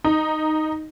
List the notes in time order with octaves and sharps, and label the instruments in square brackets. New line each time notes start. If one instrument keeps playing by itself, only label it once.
[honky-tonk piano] D#4